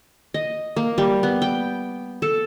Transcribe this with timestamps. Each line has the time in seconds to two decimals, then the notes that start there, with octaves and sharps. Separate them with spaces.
0.34 D#5
0.76 A#3
0.98 G3
1.23 B3
1.42 G5
2.22 A4